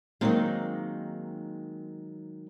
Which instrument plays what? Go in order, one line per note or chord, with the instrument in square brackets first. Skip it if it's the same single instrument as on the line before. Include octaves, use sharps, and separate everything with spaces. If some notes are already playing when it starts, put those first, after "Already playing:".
[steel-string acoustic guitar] D#3 F#3 G#3 [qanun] A#3 C4 D#4